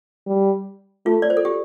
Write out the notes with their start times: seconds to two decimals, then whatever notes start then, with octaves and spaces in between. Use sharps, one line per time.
0.27 G3
1.06 A3 F4
1.22 D5
1.30 C5
1.37 A4
1.45 G4